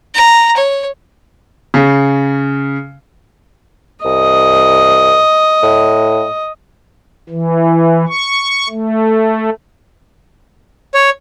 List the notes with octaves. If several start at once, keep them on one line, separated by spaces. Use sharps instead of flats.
A#5
C#5
C#3
C2 D#5
A2
E3
C#6
A3
C#5